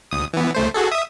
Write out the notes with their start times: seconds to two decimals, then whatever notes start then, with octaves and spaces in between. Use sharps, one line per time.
0.11 D2 D#6
0.33 E3 B3
0.55 C#2 A3 C5
0.74 F#4 G#4 A4
0.91 E5 D#6